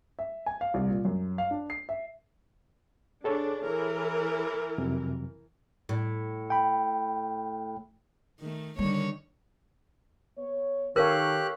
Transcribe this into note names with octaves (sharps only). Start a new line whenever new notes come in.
E5
G#5
F5
C2
A#2
F#2
F5
D4
C7
E5
D4 G#4 A4 C#5
E3 A#4
F2 C3 F#3
A2
G5 B5
D#3 A3
D3 D#3 G3 C#5
B3 C#5
D#3 G4 A4 A#4 C#5 F5 F#6